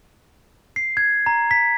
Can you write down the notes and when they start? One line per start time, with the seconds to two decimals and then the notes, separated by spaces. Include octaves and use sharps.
0.76 C7
0.97 G#6
1.26 A#5
1.51 B6